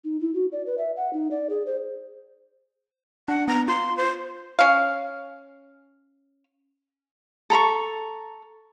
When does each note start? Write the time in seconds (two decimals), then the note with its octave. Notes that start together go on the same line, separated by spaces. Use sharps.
0.04 D#4
0.21 E4
0.34 F#4
0.52 D5
0.66 B4
0.78 E5
0.96 F#5
1.13 D#4
1.31 D5
1.50 G#4
1.66 C5
3.28 D4 F#5
3.48 B3 A#5
3.68 F4 C6
3.97 C5
4.59 C#4 F5
7.50 A4 A#5 B5 C#6